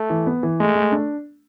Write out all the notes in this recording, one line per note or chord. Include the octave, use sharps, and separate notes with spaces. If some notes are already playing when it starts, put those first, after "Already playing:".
Already playing: A3
E3
B3
E3
G#3 A3
A3
D4